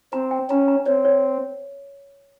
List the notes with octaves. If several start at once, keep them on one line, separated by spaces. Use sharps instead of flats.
C4 A#5
G5
C#4 A#5
A#5
C4 C#5
C#5